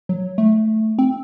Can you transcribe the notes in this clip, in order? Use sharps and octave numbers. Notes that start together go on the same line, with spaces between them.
F#3
A3
C4